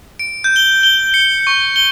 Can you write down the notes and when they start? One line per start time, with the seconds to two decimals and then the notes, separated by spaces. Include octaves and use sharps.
0.19 D7
0.44 G6
0.56 G7
0.83 G7
1.14 C#7
1.47 C#6
1.76 G7